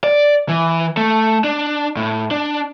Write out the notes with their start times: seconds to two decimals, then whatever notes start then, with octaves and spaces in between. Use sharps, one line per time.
0.04 D5
0.49 E3
0.97 A3
1.44 D4
1.97 A2
2.31 D4